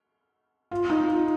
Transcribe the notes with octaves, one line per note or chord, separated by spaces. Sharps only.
F4
D#4
F4